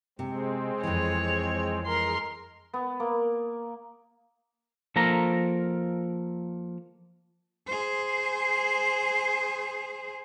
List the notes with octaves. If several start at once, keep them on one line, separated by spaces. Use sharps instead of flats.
C3 G#3 C4
F2 E3 C#5
G#3 A#4 C6
B3
A#3
F3 A#3 A4 A#4 A#5
G#4 C5